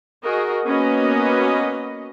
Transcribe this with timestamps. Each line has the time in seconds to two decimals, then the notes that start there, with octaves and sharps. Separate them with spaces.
0.24 F#4 G#4 A#4 D#5
0.66 A#3 B3 C#4 F#4 B4 D#5